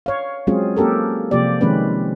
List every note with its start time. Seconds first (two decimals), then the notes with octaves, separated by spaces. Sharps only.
0.06 C#5 F5
0.47 F#3 G#3 C4 C#4 F4 G#4
0.76 A#3 C#4 G4 A4 A#4
1.31 C3 F3 A#3 G4 D5
1.61 D#3 F3 G#3 C4 C#4 B4